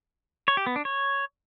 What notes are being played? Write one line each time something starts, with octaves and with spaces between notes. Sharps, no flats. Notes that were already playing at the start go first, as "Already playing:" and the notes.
C#5
G4
B3
D4
C#5